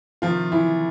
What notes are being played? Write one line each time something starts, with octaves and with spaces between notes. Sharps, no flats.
C3 D#3 F3 F4
E3 E4